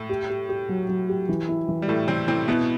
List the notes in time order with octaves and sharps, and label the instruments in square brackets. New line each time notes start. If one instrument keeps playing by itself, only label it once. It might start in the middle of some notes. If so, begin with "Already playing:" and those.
Already playing: [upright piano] A2 A3
[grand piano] G4
G4
G4
F#3
F#3
G4
E3
E4
E3
[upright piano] G3
[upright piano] A2 A3 [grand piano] E4
[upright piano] C3 C4 [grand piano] E3
[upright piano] C3 C4 [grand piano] E4
[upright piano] B2 B3 [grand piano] E4